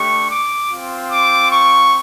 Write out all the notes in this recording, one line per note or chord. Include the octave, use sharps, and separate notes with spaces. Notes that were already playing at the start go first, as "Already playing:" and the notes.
Already playing: A3 D4 G4 C#6
D6
C4 F4
D6
C#6